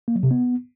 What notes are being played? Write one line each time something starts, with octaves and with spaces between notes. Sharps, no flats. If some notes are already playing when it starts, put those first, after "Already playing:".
A#3
F#3
C3
B3